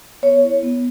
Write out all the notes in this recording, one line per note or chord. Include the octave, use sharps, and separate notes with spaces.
B3 C#5
E4
B3